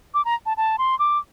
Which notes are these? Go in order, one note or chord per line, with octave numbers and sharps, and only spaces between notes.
D6
A#5
A5
A5
C6
D6